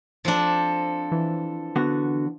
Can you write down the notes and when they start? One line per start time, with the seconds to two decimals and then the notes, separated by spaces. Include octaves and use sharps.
0.25 F3 C4 D4 A4
1.12 E3
1.76 D3 B3 F#4